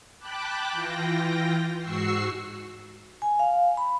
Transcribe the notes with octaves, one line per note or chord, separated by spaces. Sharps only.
G5 A5 B5 D6 F#6
E3 F4 G5 A#6
G#2 F#4 C#6 E6 C7
G#5
F5
B5